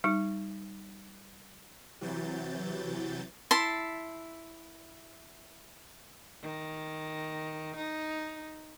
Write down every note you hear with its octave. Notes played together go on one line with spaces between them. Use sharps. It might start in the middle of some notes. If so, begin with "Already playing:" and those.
G3 D#4
C3 E3 F#3 G6 A6
E4 A5 C6
D#3
D#4